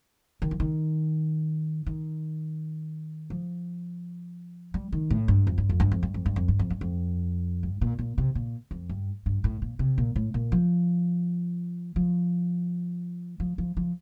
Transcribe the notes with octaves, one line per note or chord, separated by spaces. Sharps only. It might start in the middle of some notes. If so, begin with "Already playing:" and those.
D#3
F3
D#3
D#3
F3
G3
D#3
A2
G2
F2
G2
F2
G2
F2
G2
F2
G2
F2
G2
F2
G2
F2
G2
A#2
A#2
C3
A#2
F2
G2
G2
A2
A#2
C3
A#2
A2
A#2
F3
F3
F3
F3
F3